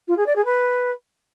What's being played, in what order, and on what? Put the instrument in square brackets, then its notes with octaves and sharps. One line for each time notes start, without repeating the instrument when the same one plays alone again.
[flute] F4
G#4
D5
G#4
B4